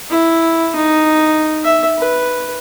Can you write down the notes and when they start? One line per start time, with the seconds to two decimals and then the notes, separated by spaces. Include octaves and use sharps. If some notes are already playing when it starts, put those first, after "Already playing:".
0.10 E4
0.76 D#4
1.64 E5
1.98 B4